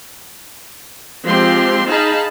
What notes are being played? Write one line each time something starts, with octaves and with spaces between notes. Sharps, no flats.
F3 G#3 C4 G4 C6
D#4 G#4 F5 A5 B5